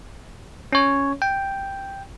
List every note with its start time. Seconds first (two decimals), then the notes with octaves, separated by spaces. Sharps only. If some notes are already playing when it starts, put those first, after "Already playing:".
0.72 C#4 C#5
1.22 G5